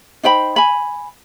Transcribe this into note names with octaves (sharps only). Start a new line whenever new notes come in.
D#4 C5 G5 B5
G#5 B5